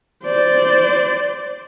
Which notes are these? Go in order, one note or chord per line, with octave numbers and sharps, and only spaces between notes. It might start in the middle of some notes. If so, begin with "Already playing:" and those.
C5 D5